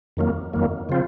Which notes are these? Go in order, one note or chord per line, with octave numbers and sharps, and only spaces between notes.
F2 D#3 F#3 A#3
F2 D#3 F#3 A#3
C#3 F3 C4 F4